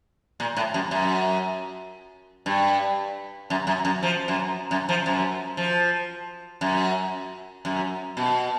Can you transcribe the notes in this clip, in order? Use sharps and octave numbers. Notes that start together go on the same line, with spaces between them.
A#2
A2
F#2
F#2
G2
F#2
F#2
F#2
F3
F#2
F#2
F3
F#2
F3
F#2
F#2
B2